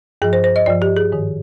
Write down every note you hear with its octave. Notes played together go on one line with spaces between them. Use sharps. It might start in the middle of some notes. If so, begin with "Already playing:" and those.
G2 F3 G#4
C5
C5
D#5
G2 F3 D5
G4
G#4
G#2 D#3